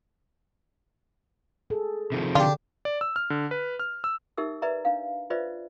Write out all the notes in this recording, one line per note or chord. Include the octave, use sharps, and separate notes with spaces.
G#4 A4
C3 D#3 F3
D3 D4 F4 G4
D5
E6
F6
D3
B4
F6
E6
D#4 G4 A#4 E5 E6
B4 D5 E5 A#5
D4 F5
F4 B4 C5 D5 E5